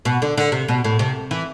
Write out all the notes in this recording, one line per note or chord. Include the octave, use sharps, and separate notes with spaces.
B2
D3
D3
C3
B2
A2
C3
E3